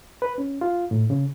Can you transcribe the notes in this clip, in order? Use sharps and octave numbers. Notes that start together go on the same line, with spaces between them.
B4
C#4
F4
A2
C#3